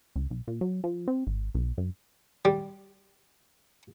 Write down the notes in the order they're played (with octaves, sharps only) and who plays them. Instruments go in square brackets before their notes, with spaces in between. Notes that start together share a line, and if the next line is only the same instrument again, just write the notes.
[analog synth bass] C#2
B1
A#2
F#3
F3
C4
G#1
B1
F#2
[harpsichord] G3